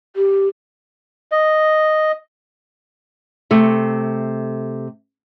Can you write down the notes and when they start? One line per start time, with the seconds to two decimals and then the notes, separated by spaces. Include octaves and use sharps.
0.16 G4
1.32 D#5
3.51 C3 A3